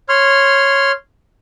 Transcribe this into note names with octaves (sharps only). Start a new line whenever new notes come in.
C#5 C6 F6